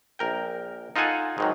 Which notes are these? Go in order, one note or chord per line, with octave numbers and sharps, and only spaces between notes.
A#1 A#4 G5
D#4 F4 A4 F#5 G#5 A5
G#2 D#3 F#3